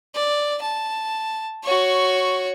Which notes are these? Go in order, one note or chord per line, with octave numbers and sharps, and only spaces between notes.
D5
A5
F#4 C#5